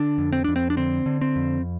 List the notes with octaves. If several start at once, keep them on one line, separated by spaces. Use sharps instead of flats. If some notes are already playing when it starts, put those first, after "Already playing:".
Already playing: D3 D4
F2
C4
F2 D4
C4
D4
D3 C4
D3
C4
F2